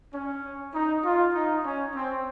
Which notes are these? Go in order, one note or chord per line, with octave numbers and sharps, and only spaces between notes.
C#4
D#4
F4
D#4
C#4
C4